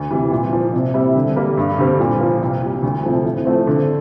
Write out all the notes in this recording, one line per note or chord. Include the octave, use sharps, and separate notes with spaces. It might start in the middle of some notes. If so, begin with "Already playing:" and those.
Already playing: D2
C3 E3 G3
A#2
F3 A#3
C3
G3 C4 E4
D3
G3 A#3
G2
D3 G3 C4
A#2
F3 A#3
C2
A#2 G3
D2
C3 F3 A3
A2
F3 A3 C4
D3